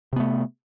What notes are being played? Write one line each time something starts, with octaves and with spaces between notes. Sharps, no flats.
C3 A3 B3